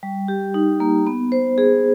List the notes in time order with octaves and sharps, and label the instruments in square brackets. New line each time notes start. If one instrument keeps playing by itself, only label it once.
[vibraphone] G3
G4
D#4
A#3
B3
C5
G#4